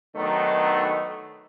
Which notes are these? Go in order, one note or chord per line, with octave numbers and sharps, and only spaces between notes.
D#3 F#3 A3 B3 D4 D#4